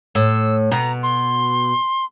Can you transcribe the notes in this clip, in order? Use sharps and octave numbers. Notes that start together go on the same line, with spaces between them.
A2 E6
B2 A#5
C6